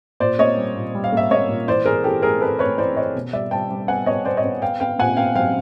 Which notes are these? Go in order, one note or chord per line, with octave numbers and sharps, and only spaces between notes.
A#2 C5 D5
A#3 C#5 D#5
G3
A#2
G3
F5
A#3 E5
A#3 C#5 D#5
A#2
E3 C5 D5
E3 G#4 A#4
E3 G4 A4
A3 G#4 A#4
C4 A4 B4
A3 B4 C#5
E3 C5 D5
C4 C#5 D#5
B2
G3 D5 E5
G3 G5 A5
G3
B3 F#5 G#5
B3 C#5 D#5
B3 C5 D5
C#5 D#5
B3
B3 F5 G5
B3 F5 G5
A#2 F#5 G#5
B3 F5 G5
F#3 F5 G5